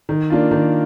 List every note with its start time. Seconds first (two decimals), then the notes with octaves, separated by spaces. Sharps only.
0.09 D#3
0.30 A#3 D4 F4
0.51 D#3